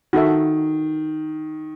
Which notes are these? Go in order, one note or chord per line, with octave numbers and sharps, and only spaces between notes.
D#3 F#4 A4 E5